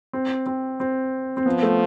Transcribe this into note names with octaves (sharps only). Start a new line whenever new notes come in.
C4
C4
C4
C4
F3 B3
A3